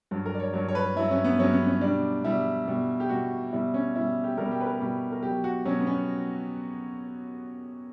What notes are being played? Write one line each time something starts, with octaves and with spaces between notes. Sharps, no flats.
G2 F#3
A#4
D5
C#5
G2 F#3 C#5
C#5
B4
G2 F#3 E4
C#4
B3
G2 F#3 C#4
B3
C#4
B2 G3 D4
B2 G3 E4
B2 G3
G4
B2 G3 F#4
B2 G3 E4
C#4
B2 G3 E4
G4
B2 G3 A#4
G4
B4
A#4
B2 G3 G4
A#4
B2 F#3 G4
F#4
B2 F#3 C#4
B3
C#4